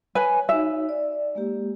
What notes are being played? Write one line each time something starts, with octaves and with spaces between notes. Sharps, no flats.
B4 C#5 G#5
D#4 F#4 C#5 E5
D5
G#3 A#3 G4